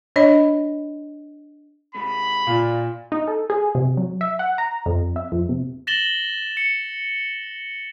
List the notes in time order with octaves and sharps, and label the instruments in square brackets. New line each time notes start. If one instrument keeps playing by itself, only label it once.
[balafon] D4 C#5 D#5 B5
[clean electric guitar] C3 G#3 [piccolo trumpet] B5
[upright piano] A#2 [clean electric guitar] D5 F5
[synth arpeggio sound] D#4
A4
G#4
C3
F#3
E5
F#5
A#5
F2
E5
F2
C3
[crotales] A6 A#6 E7 F#7 G7
C#7